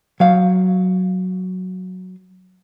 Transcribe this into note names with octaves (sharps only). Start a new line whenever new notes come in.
F#3 F5